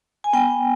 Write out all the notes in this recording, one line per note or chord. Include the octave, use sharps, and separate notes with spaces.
G#5
B3 G5